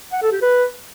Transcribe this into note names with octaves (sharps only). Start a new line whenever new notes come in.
F#5
A4
G4
B4